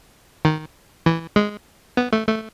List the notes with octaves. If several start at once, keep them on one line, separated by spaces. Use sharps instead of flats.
D#3
E3
G#3
B3
A3
A3